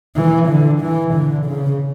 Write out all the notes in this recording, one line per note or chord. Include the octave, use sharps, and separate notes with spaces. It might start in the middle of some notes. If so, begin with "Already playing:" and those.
E3
D3
E3
D3
C#3